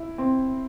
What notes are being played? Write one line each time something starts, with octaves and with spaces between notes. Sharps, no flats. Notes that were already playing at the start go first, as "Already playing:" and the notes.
Already playing: E4
C4